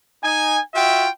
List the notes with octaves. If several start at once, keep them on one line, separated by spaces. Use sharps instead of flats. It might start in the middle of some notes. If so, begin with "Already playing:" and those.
D#4 G#5
F4 F#4 E5 G5